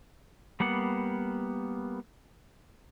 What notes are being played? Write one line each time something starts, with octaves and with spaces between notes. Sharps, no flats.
G3 A#3 B3 F#5